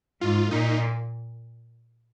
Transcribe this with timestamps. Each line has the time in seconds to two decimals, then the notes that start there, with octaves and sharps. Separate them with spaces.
0.21 G#2 F4
0.50 A#2 D#4